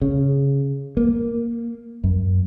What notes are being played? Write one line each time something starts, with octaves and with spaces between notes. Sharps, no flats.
C#3
A#3
F#2